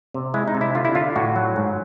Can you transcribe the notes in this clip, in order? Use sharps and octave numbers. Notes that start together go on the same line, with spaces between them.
C3
G#3 E4
D#4
C3
E4
D3 F4
E4
D3 F4
A2 F#4
F#3
G#2